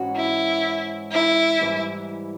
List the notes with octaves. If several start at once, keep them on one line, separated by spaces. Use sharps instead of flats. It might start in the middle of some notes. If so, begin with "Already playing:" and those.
Already playing: G#2 E3 G#3 C#4 F#4
E4
E4
G#2 E3 G3